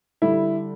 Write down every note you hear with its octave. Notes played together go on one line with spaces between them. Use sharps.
D3 G3 E4